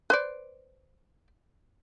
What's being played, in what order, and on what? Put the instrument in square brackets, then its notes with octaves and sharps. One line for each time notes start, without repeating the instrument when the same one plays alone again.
[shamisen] B4 C5 D5